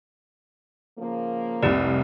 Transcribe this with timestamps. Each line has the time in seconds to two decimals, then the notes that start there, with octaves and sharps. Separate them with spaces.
0.99 C#3 F3 A#3
1.62 F1 C2 G4 D5